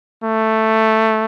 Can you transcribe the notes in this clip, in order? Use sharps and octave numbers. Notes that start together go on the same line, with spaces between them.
A3